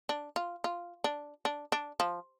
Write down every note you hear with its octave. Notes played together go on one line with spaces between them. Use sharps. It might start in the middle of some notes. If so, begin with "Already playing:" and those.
D4
F4
F4
D4
D4
D4
F3